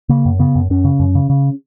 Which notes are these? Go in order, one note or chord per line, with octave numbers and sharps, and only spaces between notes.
C#3 A#3
F#2
C#3 B3
F#2
F#2 C#4
C#3
F#2
C#3
C#3